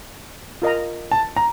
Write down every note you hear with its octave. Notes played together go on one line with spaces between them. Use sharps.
F4 A#4 D#5 A#5
A5
A#5